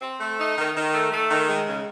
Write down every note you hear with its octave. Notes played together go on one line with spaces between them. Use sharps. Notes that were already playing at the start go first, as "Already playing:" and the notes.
C4
A3
D#4
D#3
D#3
A3
A3
D#3
G#3
C#3